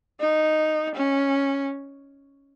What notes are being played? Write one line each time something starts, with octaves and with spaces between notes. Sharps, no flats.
D#4
C#4